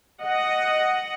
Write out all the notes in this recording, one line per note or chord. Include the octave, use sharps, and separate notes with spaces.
D#5 F#5